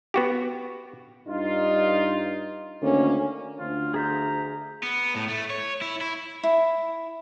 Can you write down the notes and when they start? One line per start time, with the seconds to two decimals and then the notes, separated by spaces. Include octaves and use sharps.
0.14 B3 F#4 G4
1.27 G2 D#4 F4
2.82 D2 D3 D#3 A#3 C#4
3.59 D2 F4
3.94 G#4 E5 A#5 G6
4.83 B3
5.16 A2
5.29 A3
5.50 C#5
5.81 E4
6.01 E4
6.43 E4